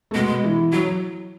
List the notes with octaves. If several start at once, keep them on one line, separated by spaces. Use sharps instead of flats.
A3
B2 G#3 B3
E3 E4
F#3 F#4